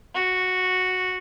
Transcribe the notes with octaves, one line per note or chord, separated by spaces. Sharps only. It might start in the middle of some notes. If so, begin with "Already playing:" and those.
F#4